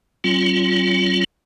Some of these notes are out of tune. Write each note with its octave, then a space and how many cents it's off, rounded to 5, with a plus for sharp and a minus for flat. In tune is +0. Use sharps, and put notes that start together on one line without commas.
F#3 +35 C#4 -45 F4 +0